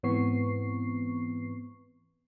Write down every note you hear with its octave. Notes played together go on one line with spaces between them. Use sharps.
G#2 E3 B3 C4 C#6 C7